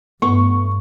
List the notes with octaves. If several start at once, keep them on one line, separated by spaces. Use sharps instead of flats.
G2 A3 B3 C#6